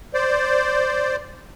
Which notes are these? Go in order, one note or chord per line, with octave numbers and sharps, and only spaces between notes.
C5 D5